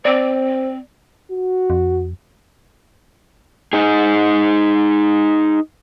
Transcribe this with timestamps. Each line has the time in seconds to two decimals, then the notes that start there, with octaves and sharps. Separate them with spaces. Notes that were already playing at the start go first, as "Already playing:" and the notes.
0.05 C4 C5 D5
1.31 F#4
1.70 F2
3.73 D#4 G#4